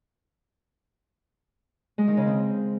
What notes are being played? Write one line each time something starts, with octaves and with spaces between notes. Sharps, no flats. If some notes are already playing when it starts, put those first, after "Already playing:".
G#3
D#3
C#3
C4